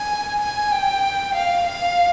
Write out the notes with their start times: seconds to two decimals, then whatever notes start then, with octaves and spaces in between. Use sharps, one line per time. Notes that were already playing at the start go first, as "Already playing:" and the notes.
Already playing: G#5
0.39 G#5
0.71 G5
1.35 F5
1.66 F5